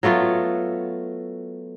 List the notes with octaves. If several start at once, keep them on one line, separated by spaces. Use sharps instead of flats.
F#3 A3 B3 F4